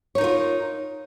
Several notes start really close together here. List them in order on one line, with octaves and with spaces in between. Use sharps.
C#5 D#4 A#4 F4